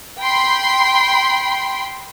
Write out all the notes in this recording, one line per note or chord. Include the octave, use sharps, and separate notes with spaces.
G5 B5 C6